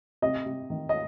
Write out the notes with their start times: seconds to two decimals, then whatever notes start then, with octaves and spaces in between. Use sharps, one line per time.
0.22 C3 D#5
0.46 C3
0.70 D#3
0.89 D#5